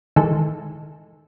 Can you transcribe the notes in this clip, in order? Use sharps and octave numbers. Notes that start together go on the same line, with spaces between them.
D#3 E3 G#3 A4